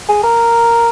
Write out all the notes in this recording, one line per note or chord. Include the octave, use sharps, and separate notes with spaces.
G#4
A#4